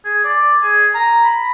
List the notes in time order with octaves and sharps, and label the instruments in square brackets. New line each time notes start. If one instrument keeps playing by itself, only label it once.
[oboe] G#4
D5
G#4
A#5
B5